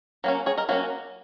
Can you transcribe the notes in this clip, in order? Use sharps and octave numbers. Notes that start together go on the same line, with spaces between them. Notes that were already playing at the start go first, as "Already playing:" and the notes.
F#3 A#3 C#4
G#4 C#5
A#4 D#5
F#3 A#3 C#4 F#4 A#4